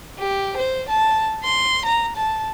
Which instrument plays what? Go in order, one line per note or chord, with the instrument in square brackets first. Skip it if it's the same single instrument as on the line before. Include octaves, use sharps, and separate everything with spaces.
[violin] G4
C5
A5
C6
A#5
A5